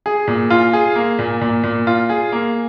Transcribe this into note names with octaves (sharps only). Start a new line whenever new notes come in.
G#4
A#2
F4
G#4
A#3
A#2
A#2
A#2
F4
G#4
A#3